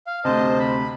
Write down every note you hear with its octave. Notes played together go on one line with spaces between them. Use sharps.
F5
D2 C3 C5 D#5 A5
B5